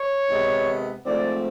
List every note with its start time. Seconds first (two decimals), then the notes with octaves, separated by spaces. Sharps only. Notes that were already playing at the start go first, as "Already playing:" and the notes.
Already playing: C#5
0.29 C3 D#3 G#3 B3
1.05 G#2 F3 A3 C4 D5